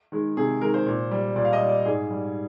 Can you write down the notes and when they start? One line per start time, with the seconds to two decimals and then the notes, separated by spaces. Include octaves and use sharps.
0.12 D#3 G#3
0.37 C3 G#4
0.61 D#3 G#3 A#4
0.74 C5
0.86 A#2
1.11 G3
1.36 A#2 D5
1.45 F5
1.53 D#5
1.61 G3
1.69 D5
1.85 G#2 G#4
2.11 G3